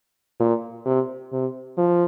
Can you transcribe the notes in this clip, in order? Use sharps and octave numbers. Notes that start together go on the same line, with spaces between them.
A#2
C3
C3
F3